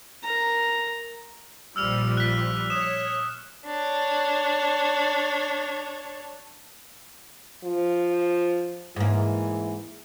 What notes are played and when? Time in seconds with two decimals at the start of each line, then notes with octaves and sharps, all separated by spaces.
0.23 A#4 A#5
1.76 A#1 F3 G3 E6 F6 F7
2.17 F#6 B6
2.70 C#5 D#6 E7
3.66 D4 C#5
7.64 F3
8.96 G#2 E3 A#3